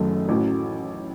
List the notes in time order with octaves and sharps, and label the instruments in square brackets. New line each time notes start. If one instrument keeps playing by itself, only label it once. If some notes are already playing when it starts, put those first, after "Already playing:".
Already playing: [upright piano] F#1 F#2 D#3 A3 D#4
A1 A2 F#3